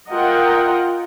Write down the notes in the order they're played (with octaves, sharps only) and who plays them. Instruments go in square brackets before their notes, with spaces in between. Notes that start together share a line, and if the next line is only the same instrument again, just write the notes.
[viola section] F4 A#4 D#5 F#5 G5